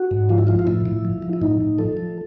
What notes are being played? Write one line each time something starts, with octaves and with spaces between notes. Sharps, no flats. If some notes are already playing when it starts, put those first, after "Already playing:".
Already playing: F#4
G#2
F3 F4
E4
F3 F4
F4
A2 E4
A2
F3
F3
E4
A2 D#4
A2
F3 A4
F3